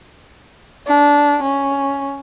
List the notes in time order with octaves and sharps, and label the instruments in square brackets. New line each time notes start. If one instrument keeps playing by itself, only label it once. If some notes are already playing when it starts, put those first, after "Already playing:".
[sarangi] D4
C#4